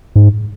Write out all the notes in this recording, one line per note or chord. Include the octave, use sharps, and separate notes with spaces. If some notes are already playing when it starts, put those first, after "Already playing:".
G#2